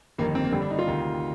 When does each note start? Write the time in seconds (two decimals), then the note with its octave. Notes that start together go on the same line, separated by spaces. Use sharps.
0.18 G1 F2 D#3 A#3
0.35 C4
0.44 A#3
0.52 G1 G2 D3 C4
0.62 D4
0.70 D#4
0.79 F4
0.87 D2 C3 D#3